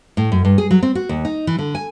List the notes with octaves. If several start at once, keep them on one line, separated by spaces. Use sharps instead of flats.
A2
F#2
G2
G#4
F#3
C4
F#4
D#2
D#4
E3
D3
G#5